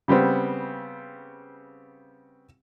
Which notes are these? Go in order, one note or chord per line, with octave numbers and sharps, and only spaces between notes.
C#3 G3 B3 C4